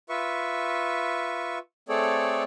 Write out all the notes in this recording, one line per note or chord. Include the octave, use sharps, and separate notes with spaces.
F4 B4 E5 C#6
A3 C4 G#4 A4 C#5 D5